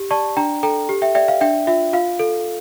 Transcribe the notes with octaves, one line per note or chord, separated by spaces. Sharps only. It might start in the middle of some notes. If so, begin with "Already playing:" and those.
Already playing: G4
D5 A5 C#6
D4 G5 A#5
A4 G5 A#5
G4
E5 G5
D5 E5 G5
F5
D4 E5 G5
F4 E5
F4 F5
A4